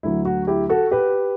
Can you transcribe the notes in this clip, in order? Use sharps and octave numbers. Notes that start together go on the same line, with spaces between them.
D2 D3 F#3 E4
F#4
E4 G4
F#4 A4
G4 B4